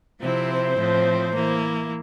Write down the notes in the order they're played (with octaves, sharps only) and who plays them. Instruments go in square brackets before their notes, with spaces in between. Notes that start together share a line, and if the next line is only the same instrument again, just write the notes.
[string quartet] C3 F3 C4 E4
[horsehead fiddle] C5
[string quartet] A2 F3 C4
E3 A#3 E4